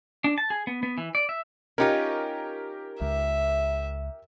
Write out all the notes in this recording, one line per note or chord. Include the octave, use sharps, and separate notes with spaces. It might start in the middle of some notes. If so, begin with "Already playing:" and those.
D4
A5
G#4
B3
B3
E3
D5
E5
C#4 D#4 F4 G4 A#4
C#2 E5